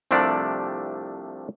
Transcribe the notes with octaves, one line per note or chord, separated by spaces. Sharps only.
C2 C3 F3 A3 D4 D5